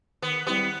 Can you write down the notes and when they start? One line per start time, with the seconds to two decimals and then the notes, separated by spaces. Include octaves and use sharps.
0.22 D#3 B3
0.47 G3 B3 C4 E4 G4